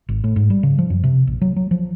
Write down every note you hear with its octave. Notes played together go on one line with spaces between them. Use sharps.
G#1
A2
G#2
G3
C#3
F3
F#2
C3
A#1
F#3
F#3
F3